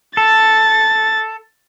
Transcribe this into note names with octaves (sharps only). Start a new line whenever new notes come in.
A4 A6